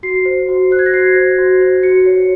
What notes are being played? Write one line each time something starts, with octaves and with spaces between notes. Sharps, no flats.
F#4 C7
C5
F#4
C5 F#6
G#6
A#6
F#4 C7
C5
F#4
C5
F#4 C#7
C#5